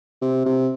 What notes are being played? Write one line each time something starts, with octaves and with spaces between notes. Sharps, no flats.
C3
C3